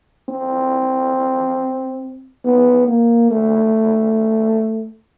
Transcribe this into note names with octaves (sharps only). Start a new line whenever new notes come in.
C4
B3
A#3
A3